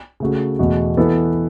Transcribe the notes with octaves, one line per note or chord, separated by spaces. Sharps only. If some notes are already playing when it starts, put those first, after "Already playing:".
C#3 A3 F#4
E2 B2 A3 F#4
E3 B3 A4